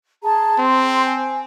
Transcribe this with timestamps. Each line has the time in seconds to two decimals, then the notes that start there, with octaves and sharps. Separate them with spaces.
0.23 G#4 A5 A#5
0.59 C4 C6
1.06 G#5